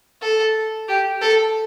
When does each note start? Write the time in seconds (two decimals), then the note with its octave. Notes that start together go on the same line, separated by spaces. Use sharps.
0.22 A4
0.88 G4
1.22 A4